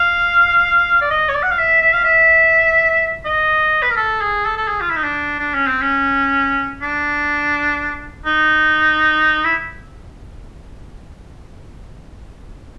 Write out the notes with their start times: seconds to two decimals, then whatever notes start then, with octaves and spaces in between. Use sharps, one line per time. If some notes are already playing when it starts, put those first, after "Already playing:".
Already playing: F5
1.02 D5
1.10 D#5
1.29 C#5
1.34 D5
1.43 F#5
1.51 F5
1.58 E5
1.82 E5
1.93 F5
2.04 E5
3.25 D#5
3.83 B4
3.90 A#4
3.96 A4
4.21 G#4
4.45 A4
4.57 A4
4.68 G#4
4.81 F4
4.90 E4
4.96 D#4
5.04 D4
5.39 D4
5.54 C#4
5.67 C4
5.82 C#4
6.82 D4
8.26 D#4
9.44 E4